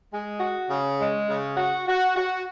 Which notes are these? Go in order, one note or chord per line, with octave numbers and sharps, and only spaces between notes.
G#3
F#4
C#3
G#3
C#3
F#4
F#4
F#4